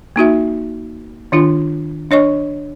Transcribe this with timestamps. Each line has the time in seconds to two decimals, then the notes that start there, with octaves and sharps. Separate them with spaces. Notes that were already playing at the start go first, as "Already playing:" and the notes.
0.16 A#3 D#4 F#4 E5
1.32 D#3 D4 F4
2.11 D4 C#5 D#5 C#6